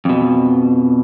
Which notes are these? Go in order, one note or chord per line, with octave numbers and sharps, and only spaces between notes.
F2 B2